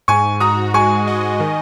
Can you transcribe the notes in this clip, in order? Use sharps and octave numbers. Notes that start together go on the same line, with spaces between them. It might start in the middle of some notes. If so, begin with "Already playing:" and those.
G#2 G#5 C#6
F#4 A#5 D#6
G#3 G#5 C#6
D#5
D#3